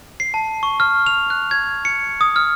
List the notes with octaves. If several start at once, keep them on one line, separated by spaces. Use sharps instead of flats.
C7
A5
C#6
F6
F7
F#6
G#6
C#7
D#6
F6